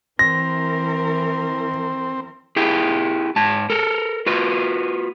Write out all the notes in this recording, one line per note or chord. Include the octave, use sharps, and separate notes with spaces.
E3 C4 A#4 A#6
E4 G4 G#4
G#2 A5
A4 A#4
F4 F#4 B4